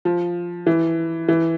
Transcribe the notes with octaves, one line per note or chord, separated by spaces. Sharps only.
F3
E3
E3